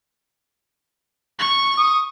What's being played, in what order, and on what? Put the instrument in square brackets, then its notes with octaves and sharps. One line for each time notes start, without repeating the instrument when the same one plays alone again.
[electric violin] C#6
[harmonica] D#6